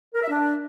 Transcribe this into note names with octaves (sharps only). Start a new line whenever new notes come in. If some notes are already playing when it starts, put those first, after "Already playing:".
A#4
E5
D4